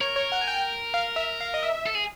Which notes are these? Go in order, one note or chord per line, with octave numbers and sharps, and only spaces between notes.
A#4 C#5
C#5
F#5
G#5
G5
F5
E5
F5
D#5
E5
A4
G#4